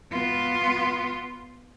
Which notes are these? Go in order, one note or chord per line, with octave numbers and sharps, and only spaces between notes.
B3 F4